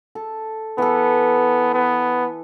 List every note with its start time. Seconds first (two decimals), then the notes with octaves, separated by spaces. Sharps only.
0.15 A4
0.78 E3 B3 A4
1.74 B3